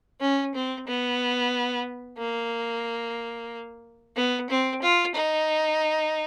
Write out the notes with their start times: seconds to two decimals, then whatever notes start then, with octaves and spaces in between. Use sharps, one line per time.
0.21 C#4
0.55 C4
0.87 B3
2.18 A#3
4.16 B3
4.50 C4
4.82 F4
5.15 D#4